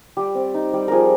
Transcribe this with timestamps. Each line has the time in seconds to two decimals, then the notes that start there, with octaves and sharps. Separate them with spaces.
0.17 G3 G4
0.35 C4
0.54 D#4
0.73 G3
0.88 F3 G#4 A#4